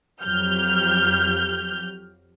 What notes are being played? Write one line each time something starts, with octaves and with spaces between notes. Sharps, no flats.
F2 F#3 G4 F6 G6